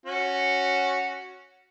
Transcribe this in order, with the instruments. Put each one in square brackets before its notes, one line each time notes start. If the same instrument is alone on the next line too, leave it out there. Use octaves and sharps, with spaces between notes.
[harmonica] C#4 F#4